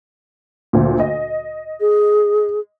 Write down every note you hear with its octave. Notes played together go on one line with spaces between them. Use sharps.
D2 A#2
D#5
G#4